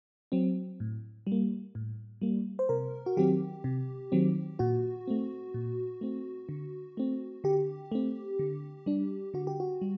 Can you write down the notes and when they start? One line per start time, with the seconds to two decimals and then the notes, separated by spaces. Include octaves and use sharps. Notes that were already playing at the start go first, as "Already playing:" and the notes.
0.32 F#3 C4
0.80 A2
1.27 G3
1.32 A#3
1.75 A2
2.21 G3 A#3
2.59 C5
2.69 C3 A#4
3.06 F#4
3.17 D#3 F#3 C4 G4
3.64 C3
4.12 D#3 F#3 C4
4.59 A#2 F#4
5.07 A3 C4
5.54 A#2
6.01 A3 C4
6.49 D3
6.97 A3 C4
7.44 D3 G4
7.92 A3 C4
8.39 D3
8.86 G3 D4
9.34 D3 F#4
9.47 G4
9.60 F#4
9.81 G3